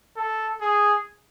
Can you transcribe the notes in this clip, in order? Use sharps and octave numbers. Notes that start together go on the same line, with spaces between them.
A4
G#4